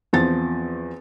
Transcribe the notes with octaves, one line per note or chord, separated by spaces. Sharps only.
E2 F3 C4 A6